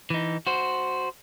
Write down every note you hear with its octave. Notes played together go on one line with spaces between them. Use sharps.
E3 D#4
F#4 C5